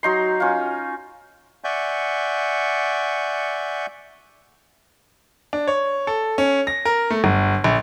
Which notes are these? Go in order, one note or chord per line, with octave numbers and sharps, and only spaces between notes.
F#3 D#4 C6
C#4 F4
D5 E5 F#5 G#5 C#6 G6
D4
C#5
A4
C#4
A#6
A#4
A3
G1
A#1